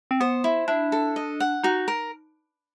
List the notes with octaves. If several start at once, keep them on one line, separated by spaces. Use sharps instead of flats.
C4
B3 C5
E4
D4 E4
A4
D#5
F#5
D#4 F#4
A#4